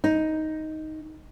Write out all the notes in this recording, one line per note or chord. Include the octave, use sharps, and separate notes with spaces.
D#4